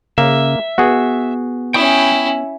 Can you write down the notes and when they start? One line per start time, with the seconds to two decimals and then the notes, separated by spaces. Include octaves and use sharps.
0.18 C#3 A#3 E5
0.78 B3 F#4 G#4
1.74 C#4 E4 G5 C#6 D#6